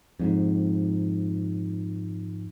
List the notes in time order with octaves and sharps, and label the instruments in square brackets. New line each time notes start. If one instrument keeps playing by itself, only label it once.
[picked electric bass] F2 G#2